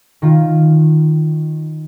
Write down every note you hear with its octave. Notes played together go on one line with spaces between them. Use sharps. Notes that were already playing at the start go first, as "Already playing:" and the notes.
D#3 F4